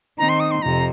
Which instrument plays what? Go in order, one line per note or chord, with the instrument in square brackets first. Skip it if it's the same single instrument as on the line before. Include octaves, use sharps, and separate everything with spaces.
[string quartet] D#3 C4 D#4 [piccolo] A#5
[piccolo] C6
D#6
C6
[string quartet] F2 C3 [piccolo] A#5